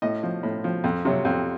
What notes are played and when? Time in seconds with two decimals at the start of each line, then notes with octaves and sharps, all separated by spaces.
0.02 A2 D#5
0.23 F3
0.43 A2
0.64 F3
0.84 F2
1.05 C3 F#3
1.25 F2